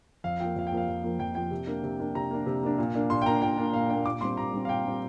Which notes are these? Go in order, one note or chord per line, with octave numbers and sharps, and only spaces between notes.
F2 F5
F3 A#3 G5
F2 F5
G5
F3 A#3 F5
F2
F3 A#3
F2 G5
F3 A#3 G5
C3
A#3 D4
C3
A#3 D4
C3 A#5
A#3 D4
C3
A#3 D4
A#2
A#3 D4
A#2 C6
G5
A#3 D4 A#5
A#2 G5
A#3 D4
A#2 F5
A#3 D4 G5
A#2 D6
G3 C4 C6
A#2 A#5
G3 C4
F5
A#2 G5
G3 C4